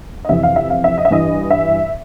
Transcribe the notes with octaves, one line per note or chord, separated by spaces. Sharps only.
D#5
F2 C3 E3 E5
F5
E5
F5
E5
D#5
E5
G2 E3 D#5
E5